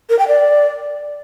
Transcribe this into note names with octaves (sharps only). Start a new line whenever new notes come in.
A#4
G5
D5